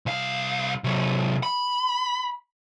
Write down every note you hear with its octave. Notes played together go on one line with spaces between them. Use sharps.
C2 F5
C3 F#3
B5